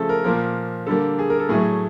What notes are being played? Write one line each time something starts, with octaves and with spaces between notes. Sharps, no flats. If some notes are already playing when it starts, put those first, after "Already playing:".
Already playing: C#3 F3 A3 G#4 A4
A#4
A#2 F3 A#3 A#4
D3 G3 A#3 A4
G#4
A#4
A4
A2 F#3 A3 G#4